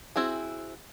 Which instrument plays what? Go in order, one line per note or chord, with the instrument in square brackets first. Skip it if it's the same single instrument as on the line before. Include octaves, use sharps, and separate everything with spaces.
[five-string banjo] C4 E4 F#4 G#4